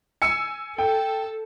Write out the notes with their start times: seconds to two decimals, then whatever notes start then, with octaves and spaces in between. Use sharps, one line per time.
0.22 G#5 E6 C#7
0.78 A4 G5